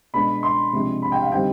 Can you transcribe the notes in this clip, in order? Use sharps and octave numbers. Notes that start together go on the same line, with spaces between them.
B2 G#3 B3 D4 B5
C6
C3 F3 G#3 D4
B5
G5
F5
D3 G3 C4 D#4 G5